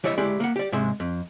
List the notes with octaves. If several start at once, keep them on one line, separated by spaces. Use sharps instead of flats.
E3 G3 E4 C#5 D#5 E5
G#3 E4 G4 D5
A#3 F#5
G4 D5
G#2 C3 G#3 E5
F2